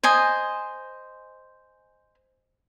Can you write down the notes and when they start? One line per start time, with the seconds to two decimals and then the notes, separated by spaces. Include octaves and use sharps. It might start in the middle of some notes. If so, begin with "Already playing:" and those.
0.03 C5 D#5 G#5